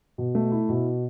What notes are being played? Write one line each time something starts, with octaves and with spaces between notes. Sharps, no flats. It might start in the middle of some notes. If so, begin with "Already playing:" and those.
B2
A3
E4
B2